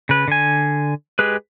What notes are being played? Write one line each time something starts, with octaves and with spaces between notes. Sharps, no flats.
C#3 B4
D3 G#5
G#3 G4 G#4 B4